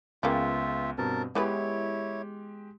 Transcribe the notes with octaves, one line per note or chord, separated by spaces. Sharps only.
C#2 C#3 A#3 B3 F4 E5 G5
G2 B2 C4 A#4 A5
E3 G#3 B3 E4 G4 B4 C#5